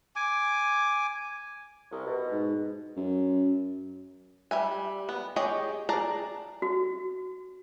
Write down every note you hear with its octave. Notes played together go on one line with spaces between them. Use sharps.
G#5 D6
C2
B2
G#2
F#2
G3 E5 G#5
B3
G4 G#4 C#5 D#5 G5
G#4 D5 A5 A#5
F#4